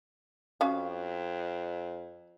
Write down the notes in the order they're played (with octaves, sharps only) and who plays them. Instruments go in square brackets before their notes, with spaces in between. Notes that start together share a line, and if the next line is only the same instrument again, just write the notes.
[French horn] F2 [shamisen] C#4 F#4 F5